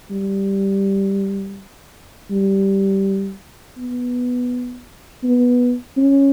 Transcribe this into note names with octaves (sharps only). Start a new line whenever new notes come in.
G3
G3
B3
B3
C#4